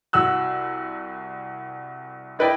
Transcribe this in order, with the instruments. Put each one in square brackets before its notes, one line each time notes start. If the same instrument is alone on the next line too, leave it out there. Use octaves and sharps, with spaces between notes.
[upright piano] C2 F#4 E6 F#6
D#4 E4 B4 D5 D#5 G5